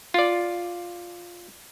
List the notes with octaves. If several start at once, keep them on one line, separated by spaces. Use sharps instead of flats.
F4 D5